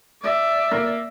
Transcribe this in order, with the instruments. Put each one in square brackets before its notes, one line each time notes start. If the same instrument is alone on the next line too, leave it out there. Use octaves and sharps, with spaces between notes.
[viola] D5 E5
[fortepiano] A#3